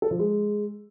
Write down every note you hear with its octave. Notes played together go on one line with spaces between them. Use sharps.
A4
F3
G#3